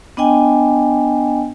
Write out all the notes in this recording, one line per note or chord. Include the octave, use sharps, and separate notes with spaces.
B3 D4 D#5 G5 G#5